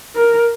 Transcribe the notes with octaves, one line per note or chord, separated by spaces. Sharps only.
A#4